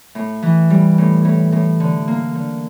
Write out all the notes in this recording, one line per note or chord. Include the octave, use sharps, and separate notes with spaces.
A2
E3
G3
A2
A2
A2
D3
A#3
D3